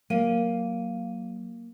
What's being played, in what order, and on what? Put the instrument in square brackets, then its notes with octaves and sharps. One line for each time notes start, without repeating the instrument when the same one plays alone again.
[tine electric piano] F#3 [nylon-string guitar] A#3 [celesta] F5 D#7